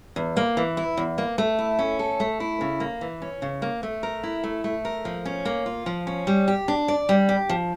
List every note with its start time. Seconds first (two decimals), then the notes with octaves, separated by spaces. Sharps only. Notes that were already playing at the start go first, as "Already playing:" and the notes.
0.16 E2
0.37 A#3
0.57 E3
0.77 E4
0.97 E2
1.18 A#3
1.38 A3
1.59 E4
1.79 C#4
1.99 A4
2.20 A3
2.40 E4
2.61 C#3
2.80 A#3
3.01 E3
3.22 C#4
3.42 C#3
3.62 A#3
3.83 A3
4.03 A#4
4.23 E4
4.44 A3
4.64 A3
4.85 A#4
5.05 F3
5.25 C#4
5.45 A#3
5.66 F4
5.86 F3
6.07 C#4
6.27 G3
6.48 G4
6.68 D4
6.88 D5
7.09 G3
7.29 G4
7.49 F3